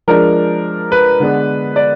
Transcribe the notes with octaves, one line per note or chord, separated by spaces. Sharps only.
F3 G#3 D4 A#4
B4
D3 G#3 B3 D4
D5